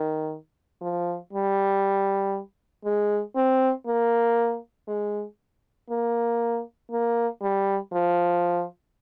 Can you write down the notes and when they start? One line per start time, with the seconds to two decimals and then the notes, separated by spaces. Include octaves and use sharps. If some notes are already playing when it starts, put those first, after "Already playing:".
Already playing: D#3
0.81 F3
1.33 G3
2.85 G#3
3.36 C4
3.87 A#3
4.88 G#3
5.90 A#3
6.91 A#3
7.42 G3
7.93 F3